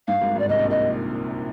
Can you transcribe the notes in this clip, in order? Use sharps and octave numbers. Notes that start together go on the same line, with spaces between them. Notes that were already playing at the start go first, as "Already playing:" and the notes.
G2 F5
G#1 G#2
G#1 G#2
D5
C2 C3 D#5
A#1 A#2
D#5